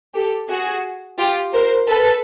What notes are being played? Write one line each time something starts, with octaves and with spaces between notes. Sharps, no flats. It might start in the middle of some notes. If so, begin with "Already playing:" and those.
G4 A4
F#4 G#4
F4 G4
A#4 C5
A4 B4